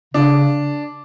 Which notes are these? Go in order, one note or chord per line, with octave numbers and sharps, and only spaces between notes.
C#3 D4